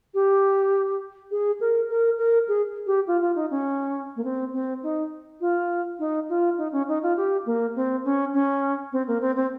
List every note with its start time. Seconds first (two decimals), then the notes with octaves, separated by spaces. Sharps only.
0.14 G4
1.31 G#4
1.60 A#4
1.90 A#4
2.18 A#4
2.48 G#4
2.86 G4
3.07 F4
3.21 F4
3.35 D#4
3.51 C#4
4.16 A#3
4.24 C4
4.53 C4
4.83 D#4
5.41 F4
5.99 D#4
6.29 F4
6.58 D#4
6.72 C#4
6.88 D#4
7.03 F4
7.17 G4
7.46 A#3
7.76 C4
8.04 C#4
8.33 C#4
8.92 C4
9.07 A#3
9.21 C4
9.36 C4